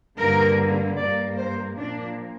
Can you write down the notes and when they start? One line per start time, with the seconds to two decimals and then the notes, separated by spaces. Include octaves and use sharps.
0.18 G2 D3 A#3 A#4
0.97 G2 G3 A#3 D5
1.37 C5
1.76 A#2 F3 A#3 D4